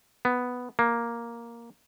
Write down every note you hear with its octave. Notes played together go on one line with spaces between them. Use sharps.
B3
A#3